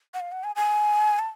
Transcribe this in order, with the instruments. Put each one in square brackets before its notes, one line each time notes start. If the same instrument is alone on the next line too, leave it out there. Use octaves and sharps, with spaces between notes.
[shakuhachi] F#5
F5
F#5
G#5
G#5
A5